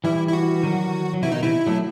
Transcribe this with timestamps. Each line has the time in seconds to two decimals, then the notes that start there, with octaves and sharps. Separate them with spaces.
0.04 E3 G3 E4
0.28 E4
0.33 F#4
0.63 D#3 F#3
1.13 F#3
1.22 C3 E3 E4
1.32 B2 D#3 D#4
1.42 C3 E3 E4
1.66 F#3 A3